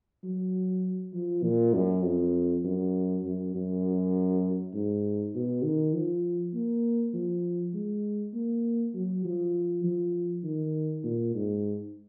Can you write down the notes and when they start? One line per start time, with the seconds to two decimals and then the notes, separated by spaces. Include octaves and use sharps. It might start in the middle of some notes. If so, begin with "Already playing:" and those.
0.24 F#3
1.13 F3
1.43 A#2
1.74 F#2
2.03 F2
2.64 F#2
3.24 F#2
3.55 F#2
4.73 G#2
5.34 B2
5.64 D#3
5.94 F3
6.54 A#3
7.14 F3
7.74 G#3
8.34 A#3
8.94 F#3
9.25 F3
9.84 F3
10.43 D#3
11.03 A#2
11.35 G#2